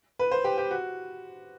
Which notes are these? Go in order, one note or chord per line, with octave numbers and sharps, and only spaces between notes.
B4
C5
G4
G4
F#4